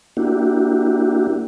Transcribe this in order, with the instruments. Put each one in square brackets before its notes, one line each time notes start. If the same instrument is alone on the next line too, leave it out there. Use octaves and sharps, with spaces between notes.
[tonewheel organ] A#3 D4 E4 F#4 G4